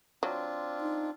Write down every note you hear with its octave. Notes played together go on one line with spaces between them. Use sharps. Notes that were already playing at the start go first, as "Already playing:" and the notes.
F#3 C4 D4 F4
D#4